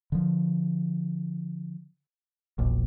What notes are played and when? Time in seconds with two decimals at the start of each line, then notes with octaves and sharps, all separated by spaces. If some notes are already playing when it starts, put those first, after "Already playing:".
0.12 D3 F3
2.59 E1 A#1